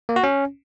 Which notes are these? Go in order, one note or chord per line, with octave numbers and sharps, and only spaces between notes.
A#3
F#4
C#4